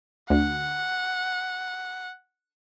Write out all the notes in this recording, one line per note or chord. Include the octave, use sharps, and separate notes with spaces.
D2 F#5